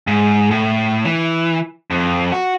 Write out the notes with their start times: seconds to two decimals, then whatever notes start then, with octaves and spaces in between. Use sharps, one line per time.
0.07 G#2
0.51 A2
1.05 E3
1.91 F2
2.32 F#4